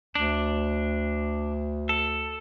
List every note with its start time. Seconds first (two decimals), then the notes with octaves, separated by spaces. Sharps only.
0.15 D2 D4
1.89 A4